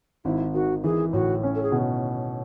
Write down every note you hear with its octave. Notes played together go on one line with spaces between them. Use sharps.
G#1 E4
D#3 F#4
E3 G#4
A2 F#4
C#4
A4
G#4
B2